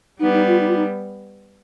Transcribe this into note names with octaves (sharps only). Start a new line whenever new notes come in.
G3 B3 D#4
D#4
F4
D#4
F4
D#4